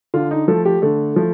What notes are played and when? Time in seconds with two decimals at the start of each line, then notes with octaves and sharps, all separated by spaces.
0.14 D3 F4
0.31 D#4
0.48 F3 A3 A4
0.65 G4
0.82 D3 A3
1.16 F3 A3